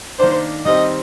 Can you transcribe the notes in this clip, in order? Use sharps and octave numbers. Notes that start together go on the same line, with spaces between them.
D#3 A#3 D4 C5
D#3 G3 C4 D#5